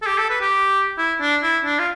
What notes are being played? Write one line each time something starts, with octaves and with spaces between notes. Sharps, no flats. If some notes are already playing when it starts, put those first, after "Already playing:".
A4
G4
A4
B4
G4
E4
D4
E4
D4
F4